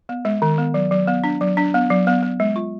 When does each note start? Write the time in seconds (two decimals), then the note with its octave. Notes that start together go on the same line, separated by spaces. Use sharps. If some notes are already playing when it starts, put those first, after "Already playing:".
0.09 B3
0.25 G#3
0.42 D#3
0.58 B3
0.74 F#3
0.91 F#3
1.08 B3
1.24 D4
1.41 F#3
1.57 D4
1.74 B3
1.90 F#3
2.07 B3
2.23 B3
2.40 G#3
2.56 F4